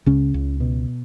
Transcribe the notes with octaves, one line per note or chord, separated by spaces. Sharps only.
C#2 C#3 C#4
C#2
B2